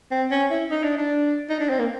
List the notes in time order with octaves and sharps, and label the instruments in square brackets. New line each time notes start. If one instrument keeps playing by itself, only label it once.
[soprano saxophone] C4
C#4
E4
D#4
D4
D4
D#4
D4
C4
A#3